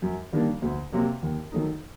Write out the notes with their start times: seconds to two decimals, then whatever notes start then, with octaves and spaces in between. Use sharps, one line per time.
0.02 F#2
0.33 D#3 G3 A#3 D4
0.62 D2
0.92 C3 F#3 A#3
1.22 D#2
1.52 D#3 F#3 A3 D#4